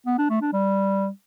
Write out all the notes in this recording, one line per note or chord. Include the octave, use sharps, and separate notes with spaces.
B3
D4
A3
D4
G3